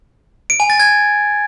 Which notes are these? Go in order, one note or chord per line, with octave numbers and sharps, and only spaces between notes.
D7
G#5
A6
G#6